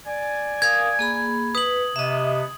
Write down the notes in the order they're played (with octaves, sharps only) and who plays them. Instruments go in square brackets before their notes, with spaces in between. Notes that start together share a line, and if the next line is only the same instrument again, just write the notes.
[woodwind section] D5 G#5
[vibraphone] A#4 F5 D#6 [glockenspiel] G#6
[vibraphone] A#3 G#4 B5
[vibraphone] B4 [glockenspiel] D#6 F#7
[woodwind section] C3 B3 [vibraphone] D#5 E5